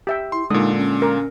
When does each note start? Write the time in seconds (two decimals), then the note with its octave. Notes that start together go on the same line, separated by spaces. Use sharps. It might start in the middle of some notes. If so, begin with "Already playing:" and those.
0.07 G4 E5 G5
0.32 E4 C6
0.50 A#2 D3 G#3 D#4 D#6
0.76 C#4
1.02 A#4